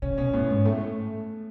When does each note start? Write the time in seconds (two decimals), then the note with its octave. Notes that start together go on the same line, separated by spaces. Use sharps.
0.02 C#3 C#4
0.18 B2 C#4
0.33 A2 B3
0.50 G#2
0.65 A2 A3